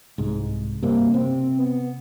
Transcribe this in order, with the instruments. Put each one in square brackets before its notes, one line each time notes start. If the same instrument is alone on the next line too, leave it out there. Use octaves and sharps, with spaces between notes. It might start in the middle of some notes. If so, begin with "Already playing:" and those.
[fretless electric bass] C2 G#2
[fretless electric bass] G2 C3 [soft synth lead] A#3
[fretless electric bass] C3 [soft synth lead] C4
[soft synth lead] B3